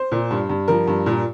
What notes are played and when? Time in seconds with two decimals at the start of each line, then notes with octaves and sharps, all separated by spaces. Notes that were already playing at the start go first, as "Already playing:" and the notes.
Already playing: C5
0.12 A#2
0.31 G2
0.49 G2
0.68 F3 A#4
0.88 G2
1.06 A#2